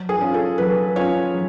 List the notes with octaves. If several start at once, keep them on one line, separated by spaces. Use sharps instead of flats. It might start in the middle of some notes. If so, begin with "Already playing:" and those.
Already playing: F#3
G#4
C#4 F4
A4
F#3 B4
C#4 F4 C#5
F#3